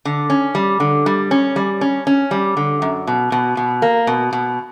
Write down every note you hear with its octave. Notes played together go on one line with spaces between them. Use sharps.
D3
C#4
G3
D3
G3
C#4
G3
C#4
C#4
G3
D3
F#2
B2
B2
B2
A#3
B2
B2